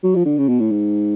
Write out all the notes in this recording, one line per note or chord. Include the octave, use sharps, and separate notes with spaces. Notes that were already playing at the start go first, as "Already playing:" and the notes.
F#3
F3
D3
C#3
B2
A2
G#2